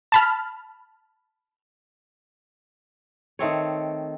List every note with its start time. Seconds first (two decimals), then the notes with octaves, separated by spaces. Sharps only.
0.12 A5 B5 F6
3.39 D#3 A3 C4 C#5